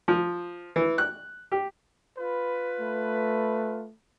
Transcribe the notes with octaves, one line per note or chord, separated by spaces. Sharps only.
F3
E3
F#6
G4
F4 B4
A3